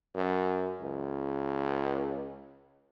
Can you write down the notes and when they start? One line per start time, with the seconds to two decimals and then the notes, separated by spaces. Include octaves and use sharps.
0.15 F#2
0.81 C#2